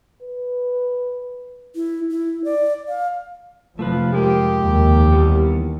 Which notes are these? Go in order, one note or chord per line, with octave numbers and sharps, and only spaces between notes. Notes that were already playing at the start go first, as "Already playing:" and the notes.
B4
E4
E4
D5
F5
F1 F3 A3 F4 B4
F2 G#3 G4 A#4
D#2
E3 G3 B3